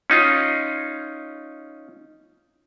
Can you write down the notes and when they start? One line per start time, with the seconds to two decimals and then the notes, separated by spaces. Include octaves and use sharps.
0.10 C#4 D#4 F4